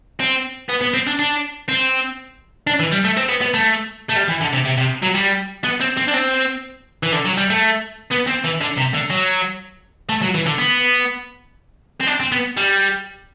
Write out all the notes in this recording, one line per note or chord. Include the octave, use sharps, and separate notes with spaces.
C4
B3
B3
C4
D4
D4
C4
D4
E3
G3
A3
C4
B3
B3
A3
A3
G3
E3
D3
C3
C3
C3
F#3
G3
B3
C4
C4
D4
C4
E3
D3
F#3
G3
A3
B3
C4
E3
D3
C3
D3
F#3
A3
F#3
E3
D3
B3
C4
D4
C4
B3
G3